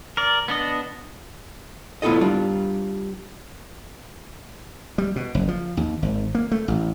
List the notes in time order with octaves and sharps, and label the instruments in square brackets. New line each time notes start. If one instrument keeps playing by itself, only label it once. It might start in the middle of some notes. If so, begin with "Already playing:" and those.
[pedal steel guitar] A#4 D5
B3 D4 D#5
[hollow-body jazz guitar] B3 E4 F4 A4 D#5
G3 D4 F4
[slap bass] G3
B2
F#1
F3
D#2
G#1
A#3
A3
A1